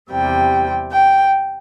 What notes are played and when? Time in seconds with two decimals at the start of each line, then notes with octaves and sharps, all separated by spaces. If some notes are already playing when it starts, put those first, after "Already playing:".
0.11 E2 C3 G3 G5
0.92 G5